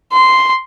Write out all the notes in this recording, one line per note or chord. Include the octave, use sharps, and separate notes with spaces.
C6